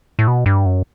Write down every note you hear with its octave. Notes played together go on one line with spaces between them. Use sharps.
A2
B2
G2
F#2